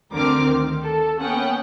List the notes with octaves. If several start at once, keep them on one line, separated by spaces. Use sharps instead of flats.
D2 D3 C4 A#4 D6 F6
D#3
A4
A#3 B3 C#4 F#5 G5